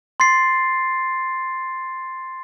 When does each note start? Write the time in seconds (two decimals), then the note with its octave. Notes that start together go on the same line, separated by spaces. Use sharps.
0.20 C6 A6 C7